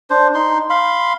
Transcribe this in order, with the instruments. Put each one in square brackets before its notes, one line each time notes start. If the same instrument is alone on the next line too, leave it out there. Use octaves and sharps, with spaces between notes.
[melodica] D4 C5
D#4 C6
F5 B5 C6